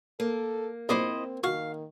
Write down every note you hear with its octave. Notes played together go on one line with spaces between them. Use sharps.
A#3 A4
A#1 C4 E4 C5 D5 D#5 D6
D#3 F#4 F5